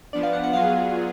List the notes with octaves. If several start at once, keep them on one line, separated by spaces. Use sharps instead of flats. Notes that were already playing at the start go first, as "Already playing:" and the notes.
F3 B3 D4 D5
F5
F#5
F#5
F#3 B3 F4 G#4 F5